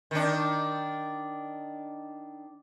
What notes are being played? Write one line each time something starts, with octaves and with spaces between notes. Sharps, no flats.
D#3 D4